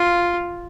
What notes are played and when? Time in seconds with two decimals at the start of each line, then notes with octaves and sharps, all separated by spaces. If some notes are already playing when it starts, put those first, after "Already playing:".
Already playing: F4